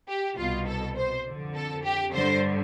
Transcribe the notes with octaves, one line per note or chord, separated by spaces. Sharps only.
G4
C2 B2 F4
A4
C5
F2 D3
A4
G4
G2 D3 C5